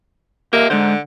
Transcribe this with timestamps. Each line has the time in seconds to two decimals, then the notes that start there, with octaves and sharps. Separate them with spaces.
0.53 A#3 G4 D#5 E5
0.70 D3 G#3 C5